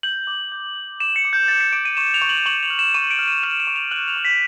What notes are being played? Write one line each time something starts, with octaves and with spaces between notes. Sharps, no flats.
G6 F#7
D6
G6
G6
D6 E7
C#7
D6
G6
G6 A6
C#7
D6 D7
D#7
C#6 E7
F7
C#6
F#7
C#6 F#7
F7
F6
E7
C#6 D#7
D7
F6
D#7
F6 E7
E7
C#6
F7
F#6 F#7
F7
C#6
B6